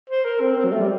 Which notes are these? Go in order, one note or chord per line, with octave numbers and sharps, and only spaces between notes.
C5
A#4
C4
C4
F#3
A3
G3